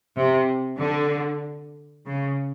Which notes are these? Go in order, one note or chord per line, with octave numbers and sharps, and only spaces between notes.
C3
D3
C#3